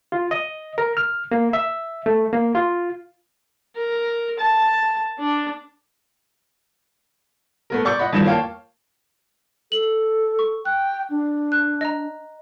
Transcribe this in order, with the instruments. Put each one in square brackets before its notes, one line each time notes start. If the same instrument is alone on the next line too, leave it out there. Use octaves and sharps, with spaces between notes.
[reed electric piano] F4
D#5
A#4
F6
A#3
E5
A3
A#3
F4
[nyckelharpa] A#4
A5
D4
[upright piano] A3 B3 A#4
D5 C#6 G6
D#5 F#5 B5
E2 G2 D#3 F3 E7
A#3 C#5 F5 G5 A5
[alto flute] A4 [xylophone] F#7
[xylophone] C#6
[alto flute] G5 [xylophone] F#6
[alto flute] D4
[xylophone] F#6
D#5 A#5